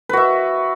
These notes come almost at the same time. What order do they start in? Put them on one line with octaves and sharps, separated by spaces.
B4 F#4 E5